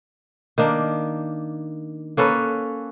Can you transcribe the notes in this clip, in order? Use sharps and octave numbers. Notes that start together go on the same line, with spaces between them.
D#3 A#3 D4
A#3 C#4 A4 B4